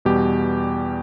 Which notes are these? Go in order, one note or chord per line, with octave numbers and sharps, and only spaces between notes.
E2 B2 G3 G4